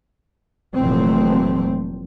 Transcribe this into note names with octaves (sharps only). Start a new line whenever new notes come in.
F1 A#2 E3 F#3 A3 C4